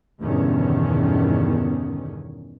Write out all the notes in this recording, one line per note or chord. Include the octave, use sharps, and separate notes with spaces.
E2 G2 B2 D3 D#3 C#4